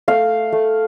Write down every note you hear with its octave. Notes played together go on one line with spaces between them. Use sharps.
A3 F5
A3